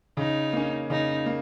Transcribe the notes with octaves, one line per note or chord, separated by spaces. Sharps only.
C#3 D#4
A#3 C#4
C#3 D#4
A#3